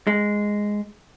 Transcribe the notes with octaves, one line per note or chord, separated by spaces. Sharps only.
G#3